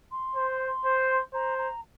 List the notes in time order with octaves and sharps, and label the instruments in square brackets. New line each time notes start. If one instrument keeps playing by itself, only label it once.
[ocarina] C6
[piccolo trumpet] C5
C5
[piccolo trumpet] C5 [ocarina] A#5
[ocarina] A#5